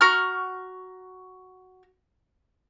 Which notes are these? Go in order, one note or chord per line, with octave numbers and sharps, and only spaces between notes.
F#4 A#5 C#6 F6